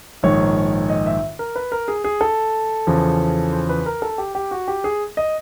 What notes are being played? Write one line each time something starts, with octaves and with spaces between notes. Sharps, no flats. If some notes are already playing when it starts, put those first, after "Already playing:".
A#1 G#2 D#3 C#5
D#5
E5
A#4
B4
A#4
G#4
G#4
A4
E2 C#3 F3
C5
B4
A#4
A4
G4
G4
F#4
G4
G#4
D#5